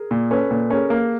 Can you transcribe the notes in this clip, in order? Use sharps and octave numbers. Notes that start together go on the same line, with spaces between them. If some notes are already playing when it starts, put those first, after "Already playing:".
Already playing: G#4 A#4
A#2
C#4 A4 B4
A#2
C#4 G#4 A#4
A#3